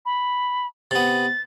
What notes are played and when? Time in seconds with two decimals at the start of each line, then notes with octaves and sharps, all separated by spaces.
0.06 B5
0.91 C3 B3 A6